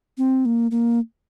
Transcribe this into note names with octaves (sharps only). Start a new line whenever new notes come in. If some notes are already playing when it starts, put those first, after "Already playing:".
C4
A#3
A#3